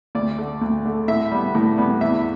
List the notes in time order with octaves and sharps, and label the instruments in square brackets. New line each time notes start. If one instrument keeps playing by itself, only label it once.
[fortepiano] D2 D5
D3 A3
D2
D3 A3
A2 E5
G3 B3
A2
G3 B3
E2 E5